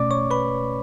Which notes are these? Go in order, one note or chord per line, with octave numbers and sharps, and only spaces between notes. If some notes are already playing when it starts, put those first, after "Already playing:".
Already playing: B2 A3 C#4 D5 D6
C#5 C#6
B4 B5